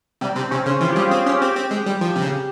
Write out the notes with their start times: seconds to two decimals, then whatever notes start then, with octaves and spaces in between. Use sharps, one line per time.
0.21 C3 G3
0.36 C3 C4
0.51 C3 C#4
0.66 C#3
0.81 E3 F4
0.90 G4
0.96 G3 G#4
1.11 C4 G#4
1.26 C#4 G4
1.41 C4 G4
1.56 C4
1.71 G#3
1.86 G3
2.01 F3
2.16 C3
2.22 C#3